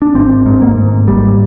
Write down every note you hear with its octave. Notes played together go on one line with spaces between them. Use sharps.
D4
G#1 C4
G#2
A#3
G#2
G#1 G3